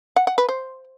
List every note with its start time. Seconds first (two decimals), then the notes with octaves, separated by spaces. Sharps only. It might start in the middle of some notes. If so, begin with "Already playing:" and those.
0.16 F#5
0.27 F#5
0.38 B4
0.49 C5